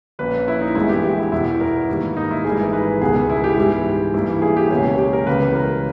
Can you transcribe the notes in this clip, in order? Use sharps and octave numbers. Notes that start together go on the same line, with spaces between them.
A#1 A#2 A#3 C#4 B4
E4
D#4
G2 E3 G#3 B3 E4
G4
G4
E4
E2 B2 G3 B3 E4
A#4
G#2 D#3 G3 A#3
D#4
E4
G#1 G#2 E3 G3 G#4
A#4
B4
C#2 B2 G3 B3 G#4
E4
G4
G#2 E3 G3 G4
G2 E3 G3 A#3 E4
G#4
G4
C#2 B2 A#3 C#4 G4
G4
A#4
C#2 C#3 E3 G3 B4
A#4